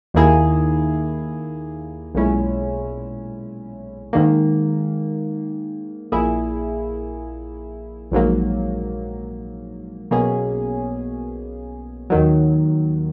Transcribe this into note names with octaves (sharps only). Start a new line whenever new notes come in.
D#2 D#3 A#3 E4 G#4
B1 A#2 G#3 C#4 E4
G#2 D#3 A#3
A#1 A#2 A#3 E4 G#4
A#1 G#2 F#3 A#3
B1 B2 A#3 C#4 G#4
D#2 D#3 F#3